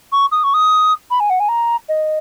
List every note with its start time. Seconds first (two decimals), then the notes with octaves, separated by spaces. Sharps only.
0.12 C#6
0.31 D#6
0.44 C#6
0.54 D#6
1.10 B5
1.20 G#5
1.30 F#5
1.40 G#5
1.48 A#5
1.89 D#5